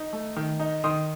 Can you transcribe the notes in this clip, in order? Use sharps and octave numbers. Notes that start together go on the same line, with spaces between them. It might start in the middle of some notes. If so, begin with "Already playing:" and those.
Already playing: D#4
A3
D#3
D#4
D#3 C6 D#6